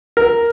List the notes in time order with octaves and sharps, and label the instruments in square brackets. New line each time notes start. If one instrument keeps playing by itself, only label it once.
[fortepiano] A#4